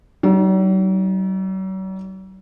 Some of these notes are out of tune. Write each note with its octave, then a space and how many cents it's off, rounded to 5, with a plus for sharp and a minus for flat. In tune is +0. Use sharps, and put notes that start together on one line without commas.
F#3 +45 D#4 +0